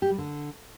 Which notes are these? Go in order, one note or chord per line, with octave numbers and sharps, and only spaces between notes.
G4
G3
D3